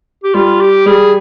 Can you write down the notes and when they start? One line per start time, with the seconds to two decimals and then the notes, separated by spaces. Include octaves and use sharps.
0.24 G4
0.34 G3 F4
0.61 G4
0.86 G3 G#4